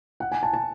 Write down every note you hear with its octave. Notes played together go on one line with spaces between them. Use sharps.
F#5
G#5
A5
A5